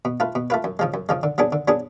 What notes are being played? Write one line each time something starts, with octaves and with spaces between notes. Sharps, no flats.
B2
A3 F4 B4
B2
A3 F4 B4
F#2
C#3 F3 G#3
F#2
C#3 F3 G#3
D3
F#3 B3 D4 G#4
D3
F#3 B3 D4 G#4